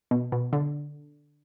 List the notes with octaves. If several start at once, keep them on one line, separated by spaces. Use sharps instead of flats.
B2
B2
D3